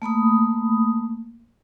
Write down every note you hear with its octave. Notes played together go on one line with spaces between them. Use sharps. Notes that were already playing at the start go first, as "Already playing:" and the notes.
A3 A#3 B5 D#6